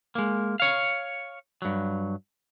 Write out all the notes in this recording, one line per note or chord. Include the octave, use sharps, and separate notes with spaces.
G#3 A#3
C#5 F5
G2 F#3